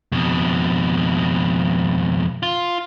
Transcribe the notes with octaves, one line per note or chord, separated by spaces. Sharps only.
F2 B2
F4